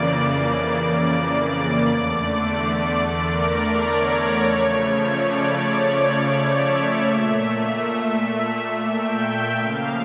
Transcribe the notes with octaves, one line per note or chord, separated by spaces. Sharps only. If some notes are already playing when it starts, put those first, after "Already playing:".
Already playing: F2 C#3 E3 A#3 D5
D5
E2 D3 A3
A#4
C#5
C#3 F3 A3
D5
E5
E5
A#2 A3 E5
G5
C#3 F3 A#3 F5